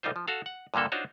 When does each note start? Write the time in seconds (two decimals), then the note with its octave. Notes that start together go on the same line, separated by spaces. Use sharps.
0.03 C2 G3 D#4 F4 C5
0.16 F3
0.28 F#4 A4 F5
0.46 F#5
0.74 G2 A#2 D3 A#3 A4
0.92 D4 D#4 F4 F#4 C5 C#5